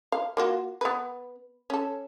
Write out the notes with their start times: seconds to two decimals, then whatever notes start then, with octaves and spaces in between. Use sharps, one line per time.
0.12 F5
0.37 A#3 F4 F#4
0.81 B3 B4
1.70 C#4 A4